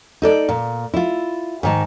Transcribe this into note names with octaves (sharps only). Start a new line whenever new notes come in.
D#4 A4 D5
A#2
E4 F4
G#2 D#3 A5